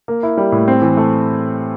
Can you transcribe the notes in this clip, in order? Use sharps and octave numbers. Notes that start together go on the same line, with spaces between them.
A#3
E4
G3
A2
C4
E3
A3